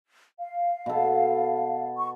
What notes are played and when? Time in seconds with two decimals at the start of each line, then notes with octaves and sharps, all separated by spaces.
0.38 F5
0.86 B2 A4
1.97 C#6